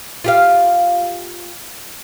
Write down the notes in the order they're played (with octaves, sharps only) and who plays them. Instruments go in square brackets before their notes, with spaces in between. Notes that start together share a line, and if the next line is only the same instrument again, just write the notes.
[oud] F4 G4 F5